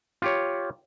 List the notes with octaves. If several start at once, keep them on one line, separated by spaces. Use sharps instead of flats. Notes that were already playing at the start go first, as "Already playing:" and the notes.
F4 G4 C#5